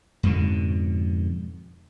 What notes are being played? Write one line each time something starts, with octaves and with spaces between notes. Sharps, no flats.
F2 G#2 B2 D3